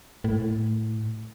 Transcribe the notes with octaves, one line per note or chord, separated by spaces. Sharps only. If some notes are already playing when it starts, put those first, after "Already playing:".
A2